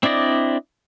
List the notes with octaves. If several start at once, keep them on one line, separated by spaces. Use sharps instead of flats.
C4 D4 E4 D5 D#5